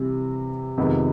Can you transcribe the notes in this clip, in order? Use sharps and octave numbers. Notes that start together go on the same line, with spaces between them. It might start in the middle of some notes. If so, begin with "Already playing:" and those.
Already playing: C3 E3 G3 C4
F2 C3 D#3 G#3 B3